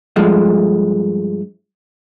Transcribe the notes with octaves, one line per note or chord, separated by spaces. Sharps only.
G2 F3 G#3 A3